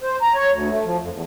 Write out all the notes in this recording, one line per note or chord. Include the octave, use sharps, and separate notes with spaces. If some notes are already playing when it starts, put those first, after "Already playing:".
C5
A#5
C#5
D2
A3
F3
F2
E2